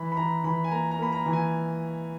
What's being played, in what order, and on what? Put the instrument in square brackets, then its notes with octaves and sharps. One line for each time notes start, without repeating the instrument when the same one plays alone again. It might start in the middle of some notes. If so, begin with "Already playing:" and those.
Already playing: [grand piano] E3 B5
B5
E3 A#5
E3 B5
G#5
A#3 A#5
A#5
A#3 B5
A#5
E3
G#5